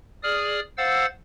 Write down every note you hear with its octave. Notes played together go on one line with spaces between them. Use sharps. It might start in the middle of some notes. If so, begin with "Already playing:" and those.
G#4 D5 D#6 F6
C5 F5 F#5 E6 A6